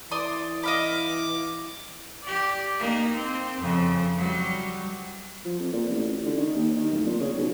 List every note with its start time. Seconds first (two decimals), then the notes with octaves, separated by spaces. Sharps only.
0.11 E3 D5 C6 D#6
0.63 D#5 F5 B5 D6
2.23 G4 D5
2.80 A#3 D#4
3.15 C4
3.61 F2 C#3
4.17 F#3 G3
5.45 F3
5.60 F2
5.73 A#2
5.90 A1
6.25 D3
6.37 D#3
6.56 D#2
6.76 D#3
6.93 D1
7.06 A#2
7.21 C#3
7.38 B1